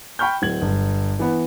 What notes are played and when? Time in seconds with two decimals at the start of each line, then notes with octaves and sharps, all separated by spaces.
0.19 G5 B5 C#6 F6 G6
0.42 D1 G#6 F#7
0.62 G1
1.19 E3 B3